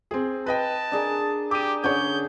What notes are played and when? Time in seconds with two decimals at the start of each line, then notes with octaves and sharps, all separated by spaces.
0.11 C4 G#4
0.46 B4 D#5 G5 A5
0.92 D4 G#4 A#4
1.51 G4 D6 D#7
1.84 D3 C#4 G#4 C#5 G6